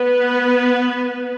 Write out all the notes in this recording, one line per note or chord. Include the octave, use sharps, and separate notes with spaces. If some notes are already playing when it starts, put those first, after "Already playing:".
Already playing: B3 B4